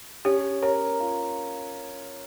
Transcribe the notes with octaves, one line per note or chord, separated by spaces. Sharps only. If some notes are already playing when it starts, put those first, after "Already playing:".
C#4 G4
A#4 C#5
F4